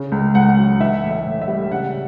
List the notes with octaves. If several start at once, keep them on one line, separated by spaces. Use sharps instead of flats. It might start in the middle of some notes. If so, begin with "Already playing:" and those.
Already playing: C#3
C#2
C#2 F#5
F#3
E3 E5
A2
E5
A2
E5
G3
C#3 F#5